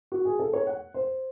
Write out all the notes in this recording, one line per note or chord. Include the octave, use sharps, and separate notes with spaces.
F#4
G#4
A4
C#5
F#5
C5